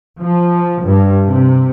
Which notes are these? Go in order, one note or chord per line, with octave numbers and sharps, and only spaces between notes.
F3
G2
C3